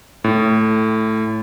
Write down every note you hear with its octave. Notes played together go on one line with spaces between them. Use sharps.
A2